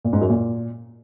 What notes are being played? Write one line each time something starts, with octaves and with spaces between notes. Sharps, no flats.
A#2
G#2
F#2
A#2